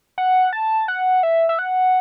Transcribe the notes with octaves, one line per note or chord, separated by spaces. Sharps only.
F#5
A5
F#5
E5
E5
F#5